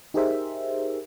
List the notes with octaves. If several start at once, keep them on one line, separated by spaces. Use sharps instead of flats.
D#4 G4 G#4 A#4 C5 E5